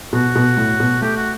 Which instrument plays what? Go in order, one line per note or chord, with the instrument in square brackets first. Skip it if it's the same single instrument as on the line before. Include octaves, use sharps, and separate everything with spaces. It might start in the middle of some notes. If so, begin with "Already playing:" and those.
[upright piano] B2 [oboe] F#4
[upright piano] B2
A2
B2
[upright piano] A3 [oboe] G4
[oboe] F#4